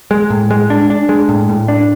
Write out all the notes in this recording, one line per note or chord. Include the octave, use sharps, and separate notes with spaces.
G#3
A2
G#3
D4
D4
G#3
A2
A2
D4